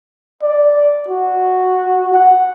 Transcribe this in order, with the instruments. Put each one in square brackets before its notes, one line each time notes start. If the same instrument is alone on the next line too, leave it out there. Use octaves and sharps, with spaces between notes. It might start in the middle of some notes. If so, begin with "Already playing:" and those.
[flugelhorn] D5
F#4
F#5